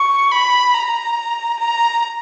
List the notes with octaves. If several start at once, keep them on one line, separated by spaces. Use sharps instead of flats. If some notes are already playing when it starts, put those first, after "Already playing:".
Already playing: C#6
B5
A#5
A#5